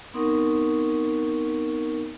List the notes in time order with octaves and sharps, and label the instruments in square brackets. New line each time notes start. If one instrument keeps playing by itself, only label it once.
[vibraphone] B3 C4 D#4 A#4 F#5 C#6